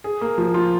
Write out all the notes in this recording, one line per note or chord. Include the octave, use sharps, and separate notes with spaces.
G#4
A#3
F3
F4